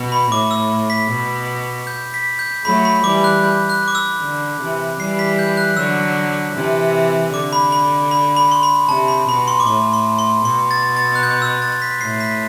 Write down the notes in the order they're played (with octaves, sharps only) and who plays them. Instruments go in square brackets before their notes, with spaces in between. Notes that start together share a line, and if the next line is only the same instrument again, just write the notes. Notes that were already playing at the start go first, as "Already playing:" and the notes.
Already playing: [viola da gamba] B2
[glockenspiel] B5
[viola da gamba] A2 [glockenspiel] D6
[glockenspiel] E6
B6
[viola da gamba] B2
[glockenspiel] G6
B6
G6
[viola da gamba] F#3 A3 [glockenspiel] B5
[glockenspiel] B5
[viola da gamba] E3 G3 [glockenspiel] D6
[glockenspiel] F#6
G6
F#6
D6
E6
[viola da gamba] D3
C3 E3
[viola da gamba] E3 G3 [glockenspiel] C7
[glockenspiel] B6
G6
F#6
[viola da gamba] D3 F#3 [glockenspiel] E6
[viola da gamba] C3 E3
[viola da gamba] D3 [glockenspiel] D6
[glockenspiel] B5
B5
B5
B5
C6
B5
[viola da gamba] C3 [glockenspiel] A5
[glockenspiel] B5
[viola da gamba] B2 [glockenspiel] B5
[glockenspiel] C6
D6
[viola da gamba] A2 [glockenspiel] C6
[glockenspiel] C6
C6
[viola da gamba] B2 [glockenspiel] C6
[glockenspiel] A6
A6
F#6
G6
E6
A6
B6
[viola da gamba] A2 [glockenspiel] C7
[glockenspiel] B6